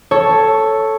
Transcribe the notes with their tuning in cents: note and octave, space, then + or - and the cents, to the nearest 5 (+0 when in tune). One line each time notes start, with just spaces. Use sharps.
A4 +0 C#5 +0